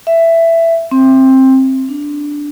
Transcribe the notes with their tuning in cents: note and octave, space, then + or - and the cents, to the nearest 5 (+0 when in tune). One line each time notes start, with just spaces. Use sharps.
E5 +10
C4 +15
D4 -5